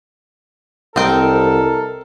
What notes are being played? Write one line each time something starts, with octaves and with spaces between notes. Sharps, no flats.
C2 C4 A4 A#4 D#5 G5